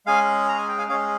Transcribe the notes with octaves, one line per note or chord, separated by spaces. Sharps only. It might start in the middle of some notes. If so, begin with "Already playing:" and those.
G#3 C#4 G#4 F5 G#5
A#5
G#5
G5
F5 G#5
G#3 C#4 G#4 C#5 F5